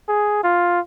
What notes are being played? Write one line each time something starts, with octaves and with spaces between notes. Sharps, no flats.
G#4
F4